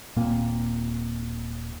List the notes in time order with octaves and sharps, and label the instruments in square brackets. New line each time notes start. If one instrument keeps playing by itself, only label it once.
[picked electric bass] D#1 A#2 A#3 C4